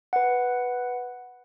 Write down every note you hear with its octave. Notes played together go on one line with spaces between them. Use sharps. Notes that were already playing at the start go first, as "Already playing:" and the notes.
B4 F#5